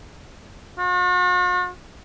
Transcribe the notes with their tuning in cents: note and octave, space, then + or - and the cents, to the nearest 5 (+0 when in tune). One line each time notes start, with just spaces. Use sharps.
F#4 -45